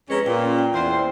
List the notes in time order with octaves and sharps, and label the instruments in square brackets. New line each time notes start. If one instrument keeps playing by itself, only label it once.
[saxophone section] F2 G#3 C#4 [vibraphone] B4 A#5
[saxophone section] A#2 [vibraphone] G5 C6
[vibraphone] C#4
G5
[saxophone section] E2 C5 [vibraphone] E4 D5 G5